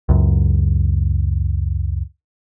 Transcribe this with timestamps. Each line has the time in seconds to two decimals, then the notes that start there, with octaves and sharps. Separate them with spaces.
0.09 C#2 F#2